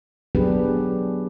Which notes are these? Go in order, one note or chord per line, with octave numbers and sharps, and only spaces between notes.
F#3 B3 D4 G4 G#4 B4